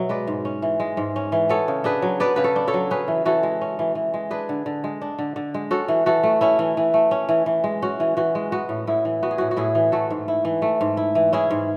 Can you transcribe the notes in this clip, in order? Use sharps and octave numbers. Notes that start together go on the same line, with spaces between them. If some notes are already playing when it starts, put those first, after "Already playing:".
Already playing: B2 F#3 E5
G#3 B4 D5
G#2
C#4
E3
G#3
G#2
C#4
E3
B3 A4 C#5
C#3
D4 G#4 B4
F#3
B3 B4 D5
C#3 B4
A4 C#5
D4
A4 C#5
F#3
C#4 G#4 B4
E3
E3 F#4 A4
G#3
C#4
E3
E3
G#3
D4 G#4 B4
D3
D3
G#3
D4
D3
D3
G#3
C#4 F#4 A4
E3
E3 F#4 A4
A3
C#4 E4
E3
E3
A3
C#4
E3
E3
G#3
C#4 F#4
E3
E3 F#4
G#3
B3 F#4
A2
A2 E4
E3
B3 F#4
G#4
A2 F#4
F#4
A2 E4 G#4
E3
A3 F#4 A4
G#2
E4
E3
A3
G#2
E4
E3
C#4 E4 G#4
G#2